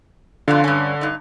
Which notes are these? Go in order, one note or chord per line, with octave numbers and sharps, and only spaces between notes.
F2 B2 D3 F4
G2 C#4
G2 D#4